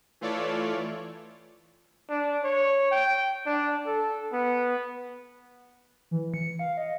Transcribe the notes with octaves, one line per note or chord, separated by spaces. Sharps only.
E3 A3 F4 A4 C#5 D5
D4
C#5
G5
D4
A4
B3
E3
C#7
F5
D#5